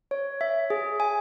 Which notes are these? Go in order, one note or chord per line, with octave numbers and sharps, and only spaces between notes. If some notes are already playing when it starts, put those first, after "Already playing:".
C#5
E5
G#4
G#5